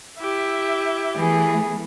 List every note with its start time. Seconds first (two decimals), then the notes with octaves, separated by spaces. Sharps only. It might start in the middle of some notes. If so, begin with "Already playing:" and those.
0.19 E4 G4 E5
1.17 E3 A3 B3 G#4